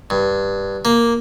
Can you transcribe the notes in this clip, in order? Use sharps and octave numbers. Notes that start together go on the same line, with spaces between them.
G2
A#3